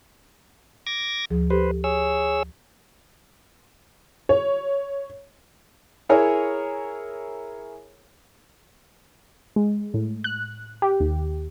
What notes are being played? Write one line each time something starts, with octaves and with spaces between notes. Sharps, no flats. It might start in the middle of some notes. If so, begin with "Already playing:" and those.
D6 G#6 A#6
D2 F3 G#4
G4 A4 B4 C5
G#4 C#5 E6
C#5
E4 G#4 A#4 C#5 G#5 A#5
G#3
A2
F#6
G4
D#2